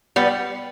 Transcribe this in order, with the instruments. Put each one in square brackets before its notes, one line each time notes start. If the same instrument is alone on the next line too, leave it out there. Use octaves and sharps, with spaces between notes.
[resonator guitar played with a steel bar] G3 B3